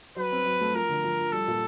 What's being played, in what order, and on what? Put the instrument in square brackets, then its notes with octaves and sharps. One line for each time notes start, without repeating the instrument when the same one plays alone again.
[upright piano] F#3 [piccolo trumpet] B4
[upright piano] C4
F#3
A3
[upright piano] F3 [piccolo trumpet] A#4
[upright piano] D3
F3
F3
[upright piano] G3 [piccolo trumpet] A4
[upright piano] A#2